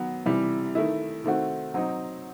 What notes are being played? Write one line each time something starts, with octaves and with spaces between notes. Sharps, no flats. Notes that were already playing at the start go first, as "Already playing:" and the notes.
Already playing: D#3 F#3 B3
C3 E3 G3
D#3 A3 E4
D#3 A3 C4 F#4
F#3 C4 D#4